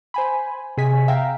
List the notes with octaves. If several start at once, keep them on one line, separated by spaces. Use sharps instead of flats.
C5 G#5 B5
C3 G#4 D#5 G#5 B6
E5 F5 G5 A#5